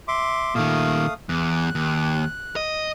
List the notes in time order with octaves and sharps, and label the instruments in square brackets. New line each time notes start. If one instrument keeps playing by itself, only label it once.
[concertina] E5 C6 D6
[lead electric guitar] A#2 D#3 [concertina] A3 F5 D#6
[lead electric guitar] E2 [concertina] F#6
[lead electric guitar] D#2
D#5